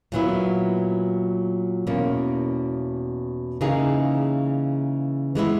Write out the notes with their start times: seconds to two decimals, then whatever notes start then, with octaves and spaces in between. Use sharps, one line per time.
0.12 A#2 F#3 B3 E4
1.87 E2 B2 A#3 C#4
3.61 C#3 E3 A#3 D#4 G#4
5.35 E3 G#3 B3 E4